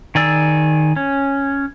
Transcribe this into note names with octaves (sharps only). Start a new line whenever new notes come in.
D#3 G#4 D5 E6
C#4